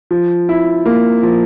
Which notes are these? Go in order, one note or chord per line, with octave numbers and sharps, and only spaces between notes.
F3
E4
A#3
F3